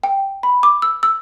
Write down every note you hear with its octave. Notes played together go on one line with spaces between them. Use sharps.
G5
B5
D6
E6
E6